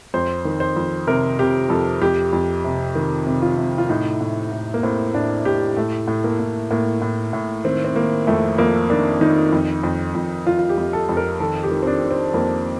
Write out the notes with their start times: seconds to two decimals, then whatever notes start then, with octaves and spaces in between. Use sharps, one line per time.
0.14 F2 C5
0.45 D#3
0.60 C5
0.76 F2
1.07 C3 A#4
1.39 C3 G4
1.70 F2 A4
2.02 F2 G4
2.33 F2
2.64 C3
2.95 D#3
3.27 C3
3.42 F4
3.57 C3
3.78 F4
3.89 A2 D#4
4.21 A2
4.52 A2
4.74 A#3
4.83 A2 C4
5.14 A2 D4
5.45 A2 G4
5.77 A2 A3
6.08 A2
6.24 A#3
6.40 A2
6.71 A2 A#3
7.02 A2
7.33 A2
7.64 D#3 C4
7.85 C4
7.96 D#3 A#3
8.27 F2 A3
8.58 F2 A#3
8.90 D#3 D4
9.21 D#3 D#4
9.52 F2
9.83 F2
10.15 F2
10.46 F2 F4
10.59 F4
10.69 G4
10.77 F2
10.93 A4
11.09 F2
11.17 A#4
11.40 D#3 A4
11.63 G4
11.71 D#3
11.83 C4
11.87 D4
12.02 D#3
12.11 C4
12.34 F2 A#3